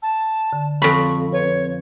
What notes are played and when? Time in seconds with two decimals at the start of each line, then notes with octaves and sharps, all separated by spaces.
0.02 A5
0.53 D3
0.82 F2 C#5 B5 C#6
1.32 C4 B4 C#5